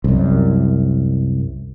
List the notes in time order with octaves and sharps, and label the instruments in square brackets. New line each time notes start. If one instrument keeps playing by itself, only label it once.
[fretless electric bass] C2 F#2